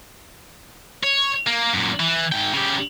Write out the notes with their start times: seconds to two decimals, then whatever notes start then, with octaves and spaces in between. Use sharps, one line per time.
1.04 C#5
1.47 A#3
1.73 F#2 A#2
2.00 E3
2.32 G#2 G5
2.53 C#3 G4